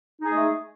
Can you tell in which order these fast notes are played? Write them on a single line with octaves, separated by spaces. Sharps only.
D#4 G#4 G#3 A3